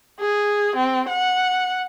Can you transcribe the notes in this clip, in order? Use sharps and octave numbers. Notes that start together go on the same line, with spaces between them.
G#4
C4
F#5